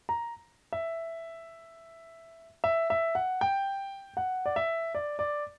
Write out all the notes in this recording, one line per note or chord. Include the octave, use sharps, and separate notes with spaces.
A#5
E5
E5
E5
F#5
G5
F#5
D5
E5
D5
D5